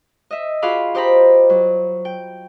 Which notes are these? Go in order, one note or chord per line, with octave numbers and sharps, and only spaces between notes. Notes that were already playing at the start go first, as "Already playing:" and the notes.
D#5 E5
F4 F#4 G#4 F5 B5 D6
G4 C5 D#5 G5 A#5 B5
F#3
G5